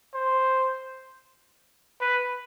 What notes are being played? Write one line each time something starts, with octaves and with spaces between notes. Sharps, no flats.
C5
B4